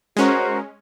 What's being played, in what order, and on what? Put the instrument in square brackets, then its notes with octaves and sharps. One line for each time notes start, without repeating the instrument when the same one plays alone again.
[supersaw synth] G#3 C#4 [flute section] F#4 A#4 C5